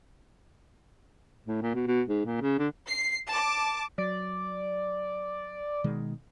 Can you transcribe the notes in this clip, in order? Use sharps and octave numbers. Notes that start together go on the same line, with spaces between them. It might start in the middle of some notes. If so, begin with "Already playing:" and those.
A2
A#2
B2
B2
G#2
A#2
C#3
D3
C7
A5 D6
F#3 D5
B2 D#3 G#3